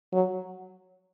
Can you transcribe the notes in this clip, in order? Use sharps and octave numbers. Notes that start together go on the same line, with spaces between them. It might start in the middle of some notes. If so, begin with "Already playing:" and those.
F#3